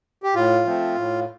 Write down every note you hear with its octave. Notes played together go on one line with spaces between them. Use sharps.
G4
A2 F4
F3 A3 C4
A2